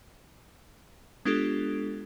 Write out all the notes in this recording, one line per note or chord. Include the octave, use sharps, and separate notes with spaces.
G#3 B3 D4 F4 G4 A4